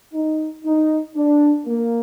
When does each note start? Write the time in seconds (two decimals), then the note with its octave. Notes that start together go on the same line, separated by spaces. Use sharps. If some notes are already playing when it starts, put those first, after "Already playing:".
0.14 D#4
0.64 D#4
1.16 D4
1.66 A#3